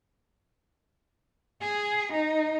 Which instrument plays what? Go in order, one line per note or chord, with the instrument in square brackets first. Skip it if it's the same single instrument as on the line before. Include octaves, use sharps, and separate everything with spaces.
[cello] G#4
D#4